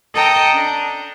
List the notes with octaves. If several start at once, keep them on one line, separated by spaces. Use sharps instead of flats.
A4 D#5 G5 A#5
D4